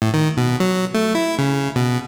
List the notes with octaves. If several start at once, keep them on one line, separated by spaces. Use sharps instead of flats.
A2
D#3
B2
F#3
A3
E4
C#3
B2